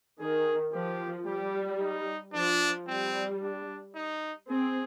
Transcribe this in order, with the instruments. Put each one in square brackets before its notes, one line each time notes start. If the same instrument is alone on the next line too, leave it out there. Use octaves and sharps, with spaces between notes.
[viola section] D#3 [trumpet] G#4
[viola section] F3 [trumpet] G4
[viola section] G3 [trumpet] G4
[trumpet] D#4
[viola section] F3 [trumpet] D4
[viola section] G3 [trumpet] C4
[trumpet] D4
D#4
[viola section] C4 [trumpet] G#4